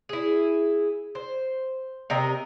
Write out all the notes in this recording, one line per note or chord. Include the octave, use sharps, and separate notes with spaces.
E4 G#4
C5
C3 A#4 D#5